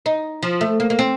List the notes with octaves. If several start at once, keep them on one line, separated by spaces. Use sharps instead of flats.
D#4
F3
A3
A#3
A#3
C4